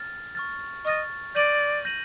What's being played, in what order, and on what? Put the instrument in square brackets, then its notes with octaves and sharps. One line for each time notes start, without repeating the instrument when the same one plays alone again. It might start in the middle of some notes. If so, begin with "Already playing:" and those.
Already playing: [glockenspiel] F6 A6
C#6 F6 A6
[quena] D#5 [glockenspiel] C#6 F6 A6
[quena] D5 [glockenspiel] G6 A#6 D#7 F#7
[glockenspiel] G6 A#6 D#7 F#7